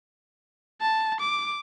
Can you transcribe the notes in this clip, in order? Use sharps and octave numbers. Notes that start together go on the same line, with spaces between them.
A5
D6